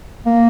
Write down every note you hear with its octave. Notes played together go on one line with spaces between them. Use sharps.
A#3